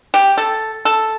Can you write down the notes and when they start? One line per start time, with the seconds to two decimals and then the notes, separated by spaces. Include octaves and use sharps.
0.14 G4
0.37 A4
0.85 A4